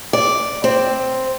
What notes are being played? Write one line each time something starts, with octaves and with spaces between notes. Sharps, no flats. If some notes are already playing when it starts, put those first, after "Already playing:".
D5
C4